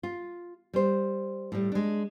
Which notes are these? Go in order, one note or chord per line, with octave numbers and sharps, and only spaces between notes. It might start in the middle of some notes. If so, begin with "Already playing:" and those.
F4
G3 C5
A2 G3
G#3 D4